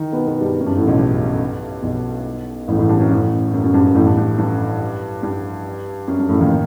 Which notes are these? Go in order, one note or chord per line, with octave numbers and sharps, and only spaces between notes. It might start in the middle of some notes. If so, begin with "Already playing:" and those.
Already playing: D#3 D#4
B2 B3
B2 B3
G2 G3
F#2
G2
A1 A2
B1 B2
G2
B1 B2
A1 A2
A1 A2
G2
F#2
A1 A2
F#2
F#2
G2
G2
A1 A2
G2
G2
G2
G2
F#2
G2
A1 A2
D#2 D#3